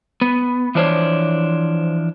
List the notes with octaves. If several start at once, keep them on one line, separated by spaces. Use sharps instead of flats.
B3
E3 F3 D4 C5 C#5